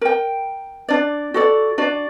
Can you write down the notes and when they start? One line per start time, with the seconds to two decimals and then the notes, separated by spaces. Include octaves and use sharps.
0.01 A#4 G5
0.89 D4 D5
1.34 F#4 A4 D5
1.78 D4 F#4 D5